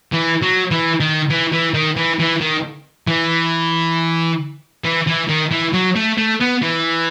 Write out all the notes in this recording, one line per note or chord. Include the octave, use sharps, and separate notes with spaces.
E3
F#3
E3
D#3
E3
E3
D#3
E3
E3
D#3
E3
E3
E3
D#3
E3
F#3
A3
A3
B3
E3